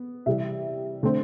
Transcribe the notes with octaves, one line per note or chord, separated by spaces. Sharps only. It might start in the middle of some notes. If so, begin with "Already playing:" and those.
Already playing: B3
C3 E3 G3 E5
D3 A3 C4